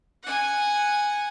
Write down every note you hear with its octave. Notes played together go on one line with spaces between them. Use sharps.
F#5 G#5